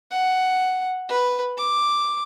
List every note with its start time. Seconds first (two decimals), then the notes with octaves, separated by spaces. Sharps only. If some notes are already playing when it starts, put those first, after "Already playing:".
0.11 F#5
1.09 B4
1.57 D6